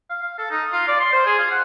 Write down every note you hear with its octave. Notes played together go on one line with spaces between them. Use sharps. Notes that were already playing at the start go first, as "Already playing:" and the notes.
F5
F5
A4
D#4
F4
D5
C6
C5
G#4
F4
F#5